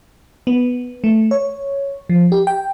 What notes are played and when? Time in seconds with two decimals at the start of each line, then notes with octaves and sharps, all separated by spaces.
0.47 B3
1.04 A3
1.31 C#5
2.09 F3
2.32 G4
2.47 G5